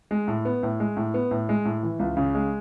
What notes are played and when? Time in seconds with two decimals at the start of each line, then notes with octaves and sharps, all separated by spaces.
0.11 G#3
0.28 A2
0.45 B3
0.63 A2
0.80 G#3
0.97 A2
1.14 B3
1.31 A2
1.49 G#3
1.65 A2
1.83 E3
1.99 C#2
2.17 C#3
2.35 G#3